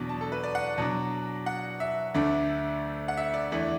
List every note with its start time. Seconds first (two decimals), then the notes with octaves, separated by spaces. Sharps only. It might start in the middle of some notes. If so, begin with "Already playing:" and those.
Already playing: E2 B2 F#3 B3 D4
0.09 A5
0.21 A4
0.32 B4
0.43 D5
0.55 F#5
0.78 B2 F#3 D4 A5
1.46 F#5
1.80 E5
2.14 D2 D3 A3 D4
3.08 F#5
3.17 E5
3.34 D5
3.52 E2 E3 A3 D4